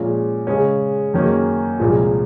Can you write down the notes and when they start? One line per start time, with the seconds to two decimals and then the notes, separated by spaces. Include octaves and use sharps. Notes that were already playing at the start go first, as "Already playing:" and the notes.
Already playing: A#2 F3 G#3 C#4 G#4
0.47 C#3 G#3 C#4
1.14 F#2 D#3 A#3 C#4 G#4
1.80 C2 A#2 F3 G#3